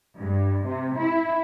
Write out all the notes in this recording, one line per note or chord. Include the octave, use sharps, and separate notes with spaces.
G2
C3
E4